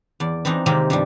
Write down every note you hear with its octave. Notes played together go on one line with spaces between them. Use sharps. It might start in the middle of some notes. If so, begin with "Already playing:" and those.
E2 D5
E3 C4 D4 D#4
C3 D#3 G#3 A#3 C4 G4
G2 F3 G3